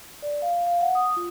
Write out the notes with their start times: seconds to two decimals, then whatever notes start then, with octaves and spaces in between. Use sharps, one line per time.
0.22 D5
0.42 F5
0.67 F5
0.81 F#5
0.95 D#6
1.17 F4